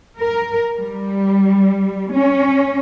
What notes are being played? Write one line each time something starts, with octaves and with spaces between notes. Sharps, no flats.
A#4
G3
C#4